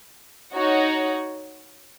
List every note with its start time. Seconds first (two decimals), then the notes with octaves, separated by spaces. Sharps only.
0.53 D#4 F#4 C#5